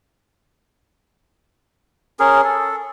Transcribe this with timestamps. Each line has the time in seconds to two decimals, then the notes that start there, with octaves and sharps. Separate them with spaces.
2.20 C#4 G#4 A#4
2.44 A4